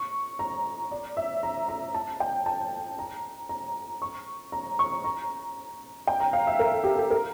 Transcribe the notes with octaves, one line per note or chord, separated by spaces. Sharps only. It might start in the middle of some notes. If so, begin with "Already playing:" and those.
Already playing: C#6
A#5
D5
E5
A#5
A#5
A5
G5
A5
A#5
A#5
C#6
A#5
C#6
A#5
G5
A#5
F5
E5
A#4
A4
G4
A4
A#4